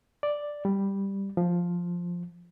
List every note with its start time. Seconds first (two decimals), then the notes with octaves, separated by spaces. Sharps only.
0.23 D5
0.65 G3
1.37 F3